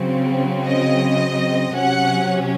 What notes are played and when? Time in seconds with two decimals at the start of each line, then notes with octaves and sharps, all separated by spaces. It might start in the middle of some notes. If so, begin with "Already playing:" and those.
Already playing: C#3 F#3 C4
0.65 D#5
1.74 C3 F#3 C#4 F#5